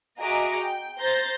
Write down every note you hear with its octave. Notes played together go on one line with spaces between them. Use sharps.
F#4 G#4 D#5 E5 A#5 D6
G5
C5 A#5 G6 A6 A#6